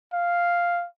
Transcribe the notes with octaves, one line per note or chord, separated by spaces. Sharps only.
F5